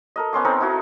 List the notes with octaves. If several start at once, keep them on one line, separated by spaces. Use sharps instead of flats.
A4 A#4 D#5
B3 C#4 C6 D6
C4 D#4 A4 A#4
D#4 E4 F#4